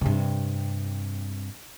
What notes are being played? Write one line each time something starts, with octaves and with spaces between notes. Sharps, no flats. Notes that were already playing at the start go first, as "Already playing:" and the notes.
G2 C3